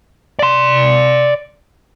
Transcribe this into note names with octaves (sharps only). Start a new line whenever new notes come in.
D5 C6